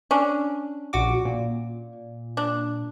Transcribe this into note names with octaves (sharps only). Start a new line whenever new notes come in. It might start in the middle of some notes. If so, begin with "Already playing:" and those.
C#4 D4
A#1 F#4 D6
A#2
D4